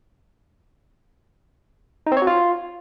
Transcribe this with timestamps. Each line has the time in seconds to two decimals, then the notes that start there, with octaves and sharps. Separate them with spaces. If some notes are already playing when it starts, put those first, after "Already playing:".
2.07 D#4
2.12 C4
2.17 C#5
2.22 F#4
2.27 F4